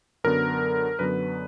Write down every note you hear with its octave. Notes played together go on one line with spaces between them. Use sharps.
F#2 D3 F#3 B3 A#4
F#2 D3 F#3 B3 B4